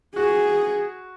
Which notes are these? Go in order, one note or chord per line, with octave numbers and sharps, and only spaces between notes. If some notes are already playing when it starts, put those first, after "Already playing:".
F#4 G#4